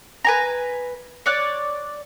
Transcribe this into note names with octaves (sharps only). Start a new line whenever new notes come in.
B4 G#5 A#5
C#5 D5 F#6